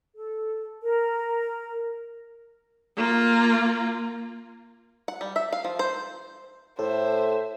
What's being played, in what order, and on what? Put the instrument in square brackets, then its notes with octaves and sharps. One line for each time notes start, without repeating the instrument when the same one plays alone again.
[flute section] A4
A#4
[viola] A#3 F4
[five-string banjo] F#5
G3
E5
F5
F3
C5
[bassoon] A2 [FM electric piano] A4 [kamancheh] C5 E5